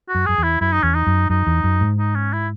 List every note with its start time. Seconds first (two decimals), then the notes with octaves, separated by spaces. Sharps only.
0.09 F#4
0.15 F#2
0.26 F#2 G#4
0.38 E2
0.43 E4
0.61 F#2 E4
0.73 D#4
0.83 E2 C#4
0.95 D#4
1.07 F#2
1.30 F#2 D#4
1.47 E2
1.64 F#2
1.81 G#2
1.98 D#4
2.15 C#4
2.33 E4